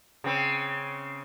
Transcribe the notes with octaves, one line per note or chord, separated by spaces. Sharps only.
C#3 C4